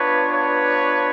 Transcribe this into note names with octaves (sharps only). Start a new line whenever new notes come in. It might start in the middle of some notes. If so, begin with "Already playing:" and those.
Already playing: B3 D4 F4 B4 C#5
B4 C#5